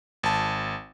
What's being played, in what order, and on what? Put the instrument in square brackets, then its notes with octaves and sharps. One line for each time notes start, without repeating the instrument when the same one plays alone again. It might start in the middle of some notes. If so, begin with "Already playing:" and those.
[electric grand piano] G#1 A5